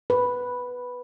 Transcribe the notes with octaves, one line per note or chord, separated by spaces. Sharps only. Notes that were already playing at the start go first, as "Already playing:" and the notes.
B4